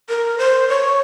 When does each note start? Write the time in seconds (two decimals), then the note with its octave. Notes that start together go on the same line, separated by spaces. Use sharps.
0.09 A#4
0.38 C5
0.69 C#5